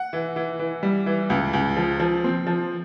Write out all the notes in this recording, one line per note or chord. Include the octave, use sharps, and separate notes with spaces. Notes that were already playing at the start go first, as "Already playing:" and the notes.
Already playing: F#5
E3
E3
E3
G3
E3
C#2
C#2
F3
F3
C4
F3